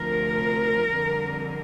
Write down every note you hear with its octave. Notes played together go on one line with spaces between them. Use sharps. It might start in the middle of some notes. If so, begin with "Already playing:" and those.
Already playing: D2 C3 F3 A#4
F2 D3 G3